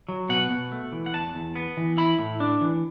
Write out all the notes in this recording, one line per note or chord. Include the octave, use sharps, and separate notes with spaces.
F#3
B2 F#5
B2
A3
E3
F#5
E2 A5
E2
B3
E3
E4 B5
A2
D4
E3